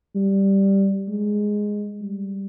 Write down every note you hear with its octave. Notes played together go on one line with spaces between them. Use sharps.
G3
G#3
G3